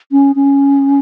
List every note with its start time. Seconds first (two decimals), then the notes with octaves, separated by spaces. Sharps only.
0.12 C#4
0.35 C#4